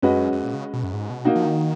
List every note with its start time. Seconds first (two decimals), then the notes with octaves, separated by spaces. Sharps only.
0.02 F#2 G#3 C#4 F#4 B4 D#5
0.33 F#2
0.43 A#2
0.53 C#3
0.73 B2
0.84 F#2
0.94 G#2
1.10 B2
1.25 A#3 D#4 F#4
1.35 F3
1.45 D#3